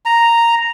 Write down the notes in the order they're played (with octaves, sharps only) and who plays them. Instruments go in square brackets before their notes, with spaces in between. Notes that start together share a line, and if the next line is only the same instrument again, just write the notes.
[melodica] A#5